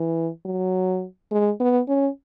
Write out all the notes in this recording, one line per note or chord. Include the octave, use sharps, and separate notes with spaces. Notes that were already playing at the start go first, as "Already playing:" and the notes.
Already playing: E3
F#3
G#3
B3
C#4